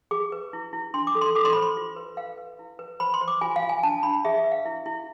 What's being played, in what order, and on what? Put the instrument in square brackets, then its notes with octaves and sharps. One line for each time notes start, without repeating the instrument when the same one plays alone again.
[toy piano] G#4 D6
B4
E4
E4
D4 C6
D6
A4
C6
A4 D6
C6
C5 B5
C6
F4
B4
B4 F5
B4
E4
B4
C5 B5
C6
C5
D6
F4 G#5
F5
F4
G#5
D4 A5
D4 B5
G#4 E5
E5
B4
F5
E4
E4